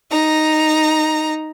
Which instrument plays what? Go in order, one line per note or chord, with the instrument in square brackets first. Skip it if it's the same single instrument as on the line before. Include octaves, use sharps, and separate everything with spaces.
[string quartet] D#4 A#5